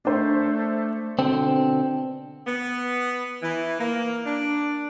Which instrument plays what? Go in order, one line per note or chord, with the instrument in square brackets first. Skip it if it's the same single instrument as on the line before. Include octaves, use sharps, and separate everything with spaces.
[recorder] A3 [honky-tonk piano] D4 C5
[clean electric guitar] B2 D3 C4
[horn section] B3
E3
A#3
D4